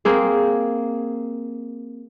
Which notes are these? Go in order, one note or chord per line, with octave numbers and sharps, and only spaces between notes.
A#3 C4 G#4